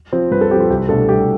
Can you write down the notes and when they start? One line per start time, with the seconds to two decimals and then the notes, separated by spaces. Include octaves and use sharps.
0.12 F3 C4
0.31 G2 B4
0.41 A4
0.51 C4 G4
0.55 F3 F4
0.70 C2 G4
0.89 B2 A3 D4 A4
1.09 C2 G4